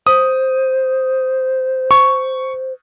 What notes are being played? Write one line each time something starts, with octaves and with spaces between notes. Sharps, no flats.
C5 D#6
C#6